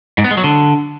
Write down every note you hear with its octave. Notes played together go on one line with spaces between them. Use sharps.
G#2
B3
G#3
F#3
D3